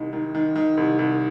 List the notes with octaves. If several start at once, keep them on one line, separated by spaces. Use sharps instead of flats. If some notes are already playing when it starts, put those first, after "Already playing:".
Already playing: C2 D#3
D#3
D#3
D#3
C2
C2